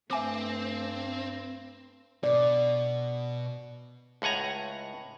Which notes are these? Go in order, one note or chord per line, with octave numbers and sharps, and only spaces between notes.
G2 A3 C4 E5 G#5 D6
B2 D5
C#2 A2 F#5 G#5 A#5